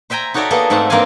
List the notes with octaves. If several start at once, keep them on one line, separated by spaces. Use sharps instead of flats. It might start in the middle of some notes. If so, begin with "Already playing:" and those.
C5 E5 G5 G#5 A#5
D#4 F#4 A4 C#5 D5 E5
A#3 B3 G#4 A4
G#2 A3 C4 E5 F#5 A5
G2 A#3 C4 D5 F5 G#5